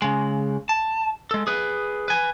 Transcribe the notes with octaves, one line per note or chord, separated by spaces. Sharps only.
C#3 G#3
A5
G#3 A4
G#4 B4
B4 G#5